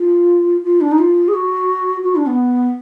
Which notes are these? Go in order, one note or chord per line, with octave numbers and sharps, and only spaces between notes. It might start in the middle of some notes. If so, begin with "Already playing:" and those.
Already playing: F4
F4
D4
D#4
F4
G#4
F#4
F#4
D4
B3